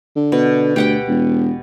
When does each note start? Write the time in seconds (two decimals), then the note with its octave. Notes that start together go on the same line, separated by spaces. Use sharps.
0.16 D3
0.32 B2
0.76 D2 G4 F#5 G5
1.08 E1